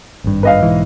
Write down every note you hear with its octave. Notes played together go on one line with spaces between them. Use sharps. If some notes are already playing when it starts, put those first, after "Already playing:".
G#1 G2
B4 D#5 F5
B1 G#2 E3